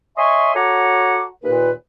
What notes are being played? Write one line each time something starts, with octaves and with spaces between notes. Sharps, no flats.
C#5 D#5 E5 G#5 C6 C#6
F#4 A4 C#5 F#5 A#5 D6
D#2 A#2 B4